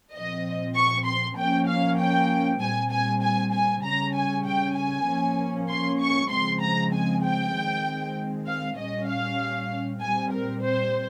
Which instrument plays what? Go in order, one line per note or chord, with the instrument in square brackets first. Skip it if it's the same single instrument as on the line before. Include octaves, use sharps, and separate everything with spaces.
[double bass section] A#2 F3 C4 [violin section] D#5
[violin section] C#6
C6
[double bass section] F3 A#3 C#4 [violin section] G5
[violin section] F5
G5
[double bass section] A#2 G3 C4 [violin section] G#5
[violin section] G#5
G#5
G#5
[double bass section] C#3 G3 C#4 [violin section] A#5
[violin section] G#5
G5
G#5
[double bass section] F3 A#3 C#4
[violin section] C6
C#6
[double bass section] C#3 F3 G#3 C4 [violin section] C6
[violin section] A#5
G#5
G5
[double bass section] D#3 G#3 C4
[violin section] F5
[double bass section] A#2 G3 C#4 [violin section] D#5
[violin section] F5
[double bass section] A#2 G3 C4 [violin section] G#5
[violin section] A#4
C5